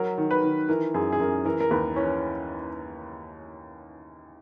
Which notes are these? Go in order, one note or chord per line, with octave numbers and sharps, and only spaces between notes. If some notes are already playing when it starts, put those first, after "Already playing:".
Already playing: F#3 A#4
D#3
B4
D#3
E3 A#4
F#2 G#4
G#4
F#2 A#4
E3 A#4
A#4
D#2 B4
E3 C#4